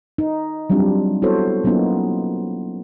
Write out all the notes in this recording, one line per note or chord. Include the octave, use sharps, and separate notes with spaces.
D#4
F#3 G3 C4 D4 F4
B3 E4 F#4 A4 C5 C#5
F#3 A#3 B3 C#4 D#4 F4